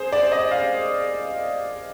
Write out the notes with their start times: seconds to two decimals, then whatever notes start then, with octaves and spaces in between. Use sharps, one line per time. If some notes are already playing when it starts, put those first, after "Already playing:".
Already playing: G#4 C5
0.13 D5
0.32 D#5
0.51 F5